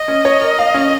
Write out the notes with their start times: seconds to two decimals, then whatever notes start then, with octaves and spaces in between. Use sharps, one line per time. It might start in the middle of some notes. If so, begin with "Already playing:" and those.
Already playing: D#5
0.08 C#4
0.25 C#5
0.41 A#4
0.59 F5
0.74 C#4